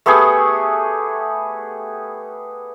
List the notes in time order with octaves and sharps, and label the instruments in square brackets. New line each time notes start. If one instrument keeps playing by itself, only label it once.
[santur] A3 B3 G4 G#4